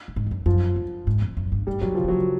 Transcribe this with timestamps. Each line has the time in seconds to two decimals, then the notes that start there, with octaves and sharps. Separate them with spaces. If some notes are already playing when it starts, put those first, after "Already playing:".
0.08 A2
0.16 G#2
0.26 F2
0.31 F#2
0.46 F#2 F3
0.76 G2
1.07 G#2
1.22 F2
1.37 F#2
1.46 G#2
1.52 G2
1.67 A2 G3
1.81 A#2 F#3
1.95 C#3 F3
2.04 D3
2.08 F#3
2.11 C#3